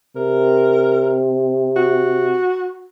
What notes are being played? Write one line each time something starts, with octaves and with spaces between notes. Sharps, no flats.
C3 A#4
F#4